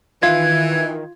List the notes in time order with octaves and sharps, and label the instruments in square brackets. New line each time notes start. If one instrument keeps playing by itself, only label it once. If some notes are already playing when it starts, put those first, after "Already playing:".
[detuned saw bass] D#3 [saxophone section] E3 [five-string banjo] F4 [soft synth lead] G#6